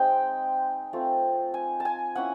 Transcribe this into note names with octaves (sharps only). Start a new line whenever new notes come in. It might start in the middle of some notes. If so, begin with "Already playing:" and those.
Already playing: G#3 C4 D#4 G5
A3 C4 F4
G#5
A5
G#5
A#3 C#4 E4 F#5